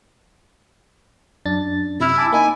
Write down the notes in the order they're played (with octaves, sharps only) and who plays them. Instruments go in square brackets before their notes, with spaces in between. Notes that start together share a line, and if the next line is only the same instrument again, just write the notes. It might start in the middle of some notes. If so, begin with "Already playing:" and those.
[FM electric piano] F#2 D4 A6
[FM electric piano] C3 F6 [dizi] E4
[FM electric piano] G#5 A5 D6
[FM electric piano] A#3 D#4 [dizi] G#5